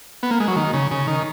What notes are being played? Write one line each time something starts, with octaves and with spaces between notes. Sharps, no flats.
B3
A#3
G#3
F#3
D#3
C#3
C#3
D#3